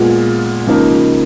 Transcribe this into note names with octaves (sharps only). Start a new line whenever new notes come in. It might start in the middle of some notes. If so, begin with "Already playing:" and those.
Already playing: A#2 G#3 B3 F4
C#2 C#3 F3 A#3 D#4